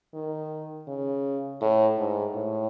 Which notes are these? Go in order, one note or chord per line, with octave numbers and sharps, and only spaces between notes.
D#3
C#3
A2
G#2
A2